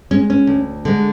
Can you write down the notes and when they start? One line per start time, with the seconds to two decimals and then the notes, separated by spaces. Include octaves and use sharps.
0.11 G#3 C#4
0.30 C#4
0.47 D2
0.85 D3 G#3